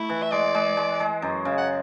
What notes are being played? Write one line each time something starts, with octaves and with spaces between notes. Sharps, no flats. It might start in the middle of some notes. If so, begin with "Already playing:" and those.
Already playing: A3 E4
E3
E5
G#3 D5
G#3
G#3
G#3
F#2
C#3
F#5